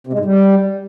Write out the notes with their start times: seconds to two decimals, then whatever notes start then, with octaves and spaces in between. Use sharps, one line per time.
0.07 C3
0.13 G#3
0.19 G#2
0.25 G3